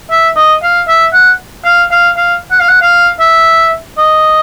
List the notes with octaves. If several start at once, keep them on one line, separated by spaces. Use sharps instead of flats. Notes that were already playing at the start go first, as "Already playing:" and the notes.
E5
D#5
F5
E5
F#5
F5
F5
F5
F#5
F5
F#5
F5
E5
D#5